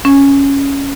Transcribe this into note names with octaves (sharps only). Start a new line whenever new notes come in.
C#4